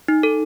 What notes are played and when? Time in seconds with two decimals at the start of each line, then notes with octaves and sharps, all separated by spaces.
0.08 D#4
0.23 A4